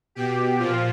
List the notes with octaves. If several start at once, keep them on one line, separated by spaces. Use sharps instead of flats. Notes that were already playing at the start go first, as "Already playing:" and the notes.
B2 G4
A#2 F3 F4